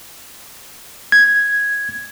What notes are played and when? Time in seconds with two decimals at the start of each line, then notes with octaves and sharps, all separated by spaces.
1.12 G#6